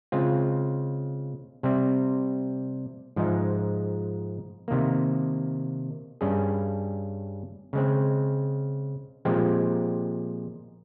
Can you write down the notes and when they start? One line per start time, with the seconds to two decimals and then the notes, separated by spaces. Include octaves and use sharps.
0.12 C#3 G#3 C4 F4
1.63 C3 G3 C4
3.16 G#2 F3 G#3 D#4
4.68 C3 D#3 A#3
6.21 G2 G3 C#4 G#4
7.73 C#3 G#3 C4
9.25 A#2 F3 G#3 C4 G4